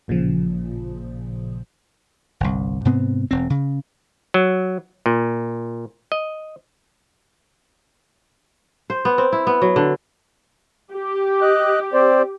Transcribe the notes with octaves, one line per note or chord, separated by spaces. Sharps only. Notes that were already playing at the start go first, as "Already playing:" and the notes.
A1 A#2 C#3 F3
G1 C2
G#2 C3 B3 C4
E1 C4
C#3
F#3
A#2
D#5
C5
B3
C4
E4
B3
F#3
D3
G4
D#5 F#6
C4 C5 D5